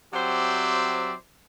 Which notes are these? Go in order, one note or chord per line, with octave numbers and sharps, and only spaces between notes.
F#3 C4 G4 C5 D5 E5